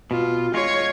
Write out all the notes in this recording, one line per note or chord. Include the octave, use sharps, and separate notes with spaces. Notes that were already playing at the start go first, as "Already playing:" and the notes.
B2 F4
G#3 F4 C#5 G#6